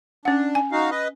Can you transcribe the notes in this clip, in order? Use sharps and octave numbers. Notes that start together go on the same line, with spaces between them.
C#4 D4 F#5
G#5
D#4 F#4 F5
B4 D#5